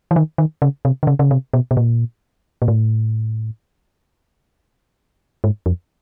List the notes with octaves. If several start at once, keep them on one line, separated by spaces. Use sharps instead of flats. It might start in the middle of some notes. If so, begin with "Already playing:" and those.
E3
D#3
D#3
C#3
C3
D3
C#3
C#3
C3
B2
B2
A#2
A#2
A2
G#2
F2